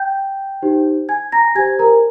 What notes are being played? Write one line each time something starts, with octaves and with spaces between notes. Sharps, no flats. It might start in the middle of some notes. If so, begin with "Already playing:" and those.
Already playing: G5 G6
D#4 G4 C5
G#5 G#6
A#5 A#6
G4 C5 G#5 G#6
A#4 A#5